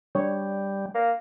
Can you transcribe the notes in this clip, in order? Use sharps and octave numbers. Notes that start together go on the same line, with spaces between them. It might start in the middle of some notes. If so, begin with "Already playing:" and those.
G3 D4 C#5
A#3